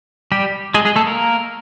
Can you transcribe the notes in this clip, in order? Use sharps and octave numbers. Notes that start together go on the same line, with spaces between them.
G3 G4
G#3 G#4
G#3 G#4
A3 A4
A#3 A#4